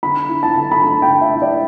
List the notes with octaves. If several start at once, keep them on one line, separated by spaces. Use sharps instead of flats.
D3 B5
E4
A5
D3
B5
A3 A5
G5
D3
E5
E4
D5